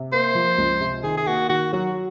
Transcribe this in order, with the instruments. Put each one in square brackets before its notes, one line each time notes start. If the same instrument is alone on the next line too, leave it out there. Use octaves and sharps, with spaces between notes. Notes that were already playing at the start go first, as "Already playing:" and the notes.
Already playing: [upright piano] C3
[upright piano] A#3 [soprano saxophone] C5
[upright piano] F3
C#2
C3
[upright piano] D#3 [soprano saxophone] G#4
[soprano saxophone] G#4
[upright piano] A#3 [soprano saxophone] F#4
[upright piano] D#3 [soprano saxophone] F#4
[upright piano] F#3 [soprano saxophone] F#4